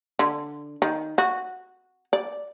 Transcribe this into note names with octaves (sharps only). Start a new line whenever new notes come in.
D3
D#3
F#4
D5